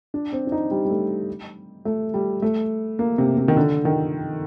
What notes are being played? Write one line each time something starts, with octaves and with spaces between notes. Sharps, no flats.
D4
C4
D4
D#4
G3
G3
A3
A3
G3
A3
A#3
C3
C3
D#3
D3
D#3